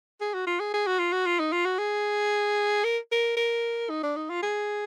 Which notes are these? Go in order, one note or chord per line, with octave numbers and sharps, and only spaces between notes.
G#4
F#4
F4
G#4
G#4
F#4
F4
F#4
F4
D#4
F4
F#4
G#4
A#4
A#4
A#4
D#4
D4
D#4
F4
G#4